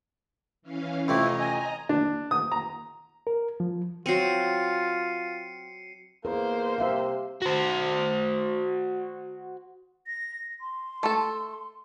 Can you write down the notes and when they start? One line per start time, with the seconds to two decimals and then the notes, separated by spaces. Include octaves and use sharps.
0.62 E3 C#4 F5
1.08 F2 C3 A3 E4 D#5 A#5
1.40 G#5
1.89 D4
2.31 D#6
2.52 A#5
3.27 A#4
3.60 F3
4.06 F#3 C4 F4 C7 C#7 D#7
6.25 E2 A#3 A#4 C5
6.78 C3 G4 E5 F5
7.42 F#4 C5
10.07 A#6
10.61 C6
11.03 A3 A4